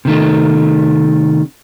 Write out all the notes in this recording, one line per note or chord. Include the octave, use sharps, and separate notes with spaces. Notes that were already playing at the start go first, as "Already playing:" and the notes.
C3 D#3 A3